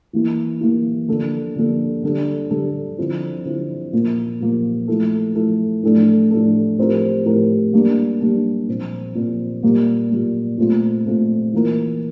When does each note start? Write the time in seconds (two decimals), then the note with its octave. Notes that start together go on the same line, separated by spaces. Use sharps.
0.13 E3 A#3 E4
0.61 E3 A#3 E4
1.08 D3 F3 A#3 D4 A4
1.56 D3 F3 A#3 D4 A4
2.03 D3 G3 D4 A4
2.51 D3 G3 D4 A4
2.98 D3 F3 C4 E4
3.45 D3 F3 C4 E4
3.93 A#2 F3 A#3
4.40 A#2 F3 A#3
4.88 F3 A3 E4 A4
5.35 F3 A3 E4 A4
5.83 A2 F3 A3 D4 A4
6.31 A2 F3 A3 D4 A4
6.78 A2 F3 C4 G4 A#4
7.25 A2 F3 C4 G4 A#4
7.73 G3 A#3 D4
8.21 G3 A#3 D4
8.68 A#2 F3 C4
9.15 A#2 F3 C4
9.63 A#2 G3 A#3
10.11 A#2 G3 A#3
10.58 A#2 A3 C4 F4
11.06 A#2 A3 C4 F4
11.53 E3 A#3 F4 A#4